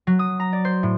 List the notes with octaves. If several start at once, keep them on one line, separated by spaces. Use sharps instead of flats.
F#3
D#6
A#5
D5
C5
A2